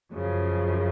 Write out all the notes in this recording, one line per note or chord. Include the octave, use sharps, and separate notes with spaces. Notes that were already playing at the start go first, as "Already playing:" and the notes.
F#2 C#3 F3